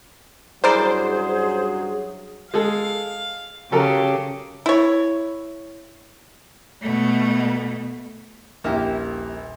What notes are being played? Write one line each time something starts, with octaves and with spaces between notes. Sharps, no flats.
G2 C#3 E3 F#3 G#4 A#4 C5 D5
G#3 G#4 A4 F5
C#3 F#3 G4 A4 A#4
E4 C#5
B2 A3
D#1 A#1 A#3 E4 G4